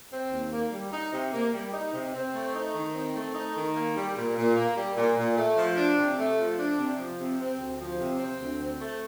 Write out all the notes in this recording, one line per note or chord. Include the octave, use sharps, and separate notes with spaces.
C4
D#2
A#3
G3
D#4
C3
A#3
G3
D#4
C3
C4
A3
D#4
D#3
C4
A3
D#4
D#3
A#3
G3
A#2
A#2
A#3
G3
A#2
A#2
A3
F3
D4
C3
A3
F3
D4
C3
F3
C3
C4
D2
F3
C3
C4
D2
C4
A3